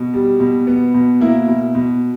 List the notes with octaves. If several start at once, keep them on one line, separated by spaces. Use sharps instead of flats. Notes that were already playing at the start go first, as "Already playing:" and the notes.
Already playing: B2
G3
B2
B3
B2
A#3 E4
B2
B2